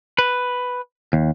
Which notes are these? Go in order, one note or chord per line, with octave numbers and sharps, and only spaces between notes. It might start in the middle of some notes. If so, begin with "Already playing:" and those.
B4
D#2